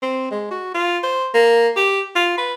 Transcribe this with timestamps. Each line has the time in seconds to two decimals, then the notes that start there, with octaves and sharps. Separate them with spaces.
0.02 C4
0.31 G#3
0.51 F#4
0.74 F4
1.03 C5
1.34 A#3
1.76 G4
2.15 F4
2.38 B4